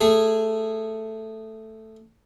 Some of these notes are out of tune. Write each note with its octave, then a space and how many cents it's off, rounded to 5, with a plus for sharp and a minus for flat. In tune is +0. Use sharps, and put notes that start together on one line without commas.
A3 +0 G#4 -15